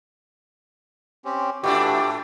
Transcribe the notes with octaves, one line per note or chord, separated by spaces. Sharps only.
C4 C#4 G4
A2 E3 A3 D4 E4 F#4 G4